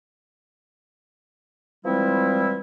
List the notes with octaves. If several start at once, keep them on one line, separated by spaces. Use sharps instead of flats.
E3 F3 G3 G#3 C4 E4